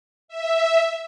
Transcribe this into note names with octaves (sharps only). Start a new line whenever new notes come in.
E5